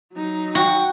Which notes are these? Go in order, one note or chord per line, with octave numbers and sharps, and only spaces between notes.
F#3 D#4
F#4 G5